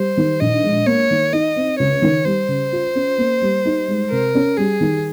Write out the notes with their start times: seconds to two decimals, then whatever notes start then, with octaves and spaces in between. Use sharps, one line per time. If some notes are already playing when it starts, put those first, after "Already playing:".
Already playing: G3 C5
0.17 D#3
0.40 A#1 D#5
0.64 G#3
0.86 A#3 C#5
1.11 D#3
1.33 D#4 D#5
1.56 C4
1.79 C#2 C#5
2.02 D#3
2.25 G3 C5
2.48 C#3
2.72 F4
2.95 C#4
3.18 A#3
3.42 G3
3.65 D#4
3.88 G#3
4.11 C3 A#4
4.35 C#4
4.57 G3 G#4
4.80 D#3